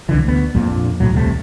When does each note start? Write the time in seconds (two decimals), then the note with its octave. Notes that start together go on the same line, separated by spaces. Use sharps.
0.09 C2 D3 E3
0.24 D2 B3
0.55 A#1 F2 A#2
1.00 B1 A2 F#3
1.13 D#1 C2 C3 A3